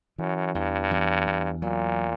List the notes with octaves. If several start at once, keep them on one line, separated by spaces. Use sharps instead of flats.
F#2 E3
E2 G2
E2
E2
A#2 F#3